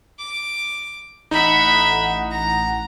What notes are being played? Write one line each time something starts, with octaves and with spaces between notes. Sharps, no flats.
D6
A1 D#4 E5 F#5 B5
A#5